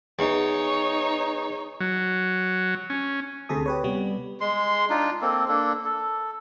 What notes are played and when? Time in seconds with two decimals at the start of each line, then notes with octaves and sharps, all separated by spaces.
0.19 E2 D#4 C#5
1.80 F#3
2.90 C#4
3.49 D2 C3 G#4 A4 D#6
3.66 G4 B4 C#5
3.84 C3 G3 B3
4.41 G#3 C6
4.90 D4 D#4 F4
5.22 A#3 C4 A4
5.48 A#3 D4 A4
5.85 A4